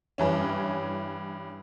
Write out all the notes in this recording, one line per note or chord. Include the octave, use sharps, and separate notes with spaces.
G2 E3 C#4